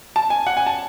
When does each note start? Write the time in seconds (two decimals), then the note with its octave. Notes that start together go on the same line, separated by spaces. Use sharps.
0.16 A5
0.30 G#5
0.47 F#5
0.57 G#5
0.66 A5